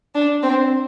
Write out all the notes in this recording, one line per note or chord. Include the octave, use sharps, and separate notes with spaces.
D4
C4